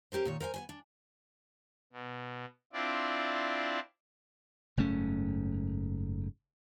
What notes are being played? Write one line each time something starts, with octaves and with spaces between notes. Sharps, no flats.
C#4 G4 A#4 C5
A#2 D#3 C#5
A#4 C5 F#5 G#5
B3 C5 G#5
D4
B2
C4 D4 E4 F4 D5
F#1 G#2 A3 C#4